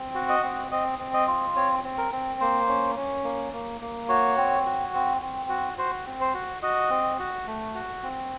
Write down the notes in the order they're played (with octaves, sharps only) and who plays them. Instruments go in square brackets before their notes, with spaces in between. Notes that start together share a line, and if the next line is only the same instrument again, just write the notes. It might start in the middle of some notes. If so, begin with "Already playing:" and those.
Already playing: [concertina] C4
F#4
D#5
C4
C4 D#5
C4
D#5
F4
C4 C#5
C4
A#4
C4
A#3 C5
C#4
C#4
A#3
A#3
A#3
F#4 C#5
C4
F#4
C4
C4
F#4
F#4 C5
C4
C5
F#4
F#4 D#5
C4
F#4
A3
F#4
C4